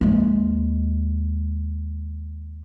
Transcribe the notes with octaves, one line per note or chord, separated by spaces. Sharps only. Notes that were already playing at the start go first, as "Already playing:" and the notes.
D#2 G#3